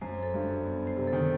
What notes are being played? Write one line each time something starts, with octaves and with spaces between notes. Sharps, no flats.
F#2 C5
A4
G2
F#4
B3
C5
C3
A4
D#3